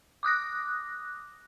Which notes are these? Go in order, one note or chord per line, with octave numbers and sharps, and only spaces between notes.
D6 D#6 F#6 A#6